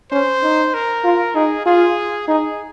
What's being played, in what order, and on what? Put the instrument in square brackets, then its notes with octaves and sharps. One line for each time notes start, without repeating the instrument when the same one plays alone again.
[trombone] C#4 [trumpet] C5
[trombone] D#4
[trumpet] A#4
[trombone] F4
[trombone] D#4 [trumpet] G#4
[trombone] F4 [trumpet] G#4
[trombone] D#4 [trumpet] G#4